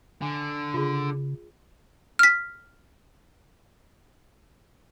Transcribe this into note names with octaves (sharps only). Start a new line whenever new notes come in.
D3 G#5
C#3 F4 G#4
F6 B6